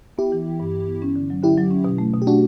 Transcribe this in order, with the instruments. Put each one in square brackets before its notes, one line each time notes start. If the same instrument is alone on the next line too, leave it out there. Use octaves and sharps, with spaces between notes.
[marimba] B3 [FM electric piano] E4 G4
[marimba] E3
E3
G2
G2
B3
C#4
D3
F#3
[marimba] D3 [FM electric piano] E4 G4
[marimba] F#3
C#4
B2
A3
B2
[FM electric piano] G4
[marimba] A3 [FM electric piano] D4 F#4